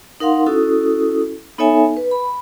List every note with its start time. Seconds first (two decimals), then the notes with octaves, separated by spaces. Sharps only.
0.20 D#4 A#4 F5 F#5 C6
0.46 C#4 E4 F#4 A4 D#6
1.58 B3 D#4 A4 C#5 E5 G#5
1.97 B4
2.11 B5